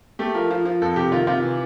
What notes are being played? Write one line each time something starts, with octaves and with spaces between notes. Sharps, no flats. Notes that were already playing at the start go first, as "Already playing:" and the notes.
A3 G4
F3 A#4
F3
F3
F2 A4
C3 G4
D#3 F4
C3 F4
E3